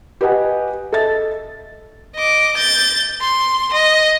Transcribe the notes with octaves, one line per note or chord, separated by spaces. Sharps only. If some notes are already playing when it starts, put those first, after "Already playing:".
G4 B4 D#5 F#5 G#5
A4 D#5 E5 A6
D#5 D6
G6 A6
C6
D#5